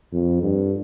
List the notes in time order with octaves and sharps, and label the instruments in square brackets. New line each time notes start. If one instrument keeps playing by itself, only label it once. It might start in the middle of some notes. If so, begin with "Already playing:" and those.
[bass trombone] F2
G2